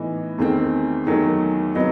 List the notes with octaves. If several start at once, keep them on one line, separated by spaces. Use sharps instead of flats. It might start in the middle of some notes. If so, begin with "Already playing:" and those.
Already playing: A2 E3 B3 D#4
E2 D#3 A3 C4
E2 D#3 F#3 A3
C3 F#3 B3 D#4